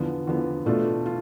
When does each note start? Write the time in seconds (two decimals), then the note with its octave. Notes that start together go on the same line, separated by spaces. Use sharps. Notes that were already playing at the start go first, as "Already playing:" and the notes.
Already playing: E2 D3 F3 B3
0.27 E2 D3 F3 B3
0.66 B2 A3 D4 F4
1.06 F4